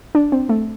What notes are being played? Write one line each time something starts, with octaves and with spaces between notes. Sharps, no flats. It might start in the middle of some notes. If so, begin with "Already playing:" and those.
D4
C4
A3